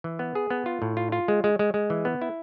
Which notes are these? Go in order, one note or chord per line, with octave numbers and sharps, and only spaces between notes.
E3
B3
G#4
B3
F4
A2
F4
F4
G#3
G#3
G#3
G#3
E3
B3
E4